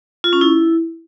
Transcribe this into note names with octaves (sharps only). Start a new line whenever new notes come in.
F4
C#4
E4